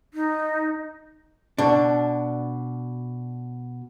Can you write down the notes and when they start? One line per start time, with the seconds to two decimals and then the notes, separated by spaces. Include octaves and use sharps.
0.14 D#4
1.58 B2 D4